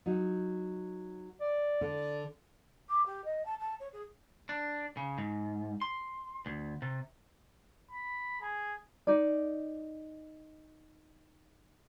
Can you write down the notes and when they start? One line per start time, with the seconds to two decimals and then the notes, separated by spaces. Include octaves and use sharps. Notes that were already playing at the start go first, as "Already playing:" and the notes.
0.06 F#3 D#4
1.41 D5
1.81 D3 D4
2.88 D6
3.06 G4
3.24 D#5
3.45 A5
3.59 A5
3.79 C#5
3.92 G#4
4.49 D4
4.97 C#3
5.18 G#2
5.82 C6
6.46 D2
6.82 C3
7.91 B5
8.41 G#4
9.07 D#4 D5